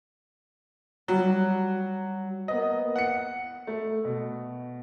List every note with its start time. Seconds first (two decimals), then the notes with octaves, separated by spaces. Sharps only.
1.08 F#3 G3
2.48 A#3 B3 D#5
2.96 F#5 C#7
3.67 A3
4.05 B2